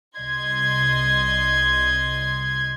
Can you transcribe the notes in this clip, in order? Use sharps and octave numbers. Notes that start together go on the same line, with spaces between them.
C2 D#5 C6 G#6